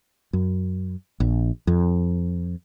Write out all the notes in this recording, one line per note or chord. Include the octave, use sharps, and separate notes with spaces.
F#2
A#1
F2